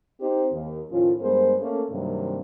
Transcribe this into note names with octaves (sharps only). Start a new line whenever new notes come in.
C4 D#4 G4 C5
D#2
A2 D#3 F3 C#4 F4
G2 G#3 B3 A#4 C5
A3 A#3 C#4
G2 C3 D#3 F#3 A#3